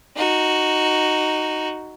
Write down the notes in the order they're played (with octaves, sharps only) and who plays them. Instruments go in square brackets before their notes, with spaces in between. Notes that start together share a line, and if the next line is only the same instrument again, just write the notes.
[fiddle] D#4 F#4